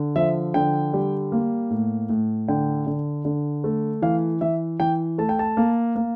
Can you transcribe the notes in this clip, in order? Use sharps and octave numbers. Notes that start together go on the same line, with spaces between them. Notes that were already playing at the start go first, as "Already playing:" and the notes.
Already playing: D3
F3 E5
D3 G5
G3
A#3
A2
A2
D3 G5
D3
D3
A3
E3 F5
E3 E5
E3 G5
A3 A5
G5
A5
A#3
A#3